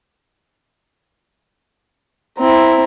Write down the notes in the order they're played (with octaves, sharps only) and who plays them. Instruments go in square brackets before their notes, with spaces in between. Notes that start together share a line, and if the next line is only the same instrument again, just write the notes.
[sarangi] C4 [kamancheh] E4 A#5